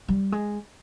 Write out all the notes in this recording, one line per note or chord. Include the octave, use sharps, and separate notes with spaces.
G3
G#3